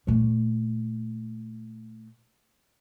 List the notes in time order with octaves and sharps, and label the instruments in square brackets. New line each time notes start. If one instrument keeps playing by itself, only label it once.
[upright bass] A#2 A3